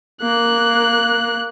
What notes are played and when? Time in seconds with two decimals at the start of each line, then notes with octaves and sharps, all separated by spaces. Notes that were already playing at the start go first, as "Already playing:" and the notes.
0.22 A#3 F#6